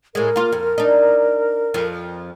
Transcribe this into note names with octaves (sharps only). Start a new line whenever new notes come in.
A2 G#3 A#4
A#3 F4
F2
D4 D#4
F2 F3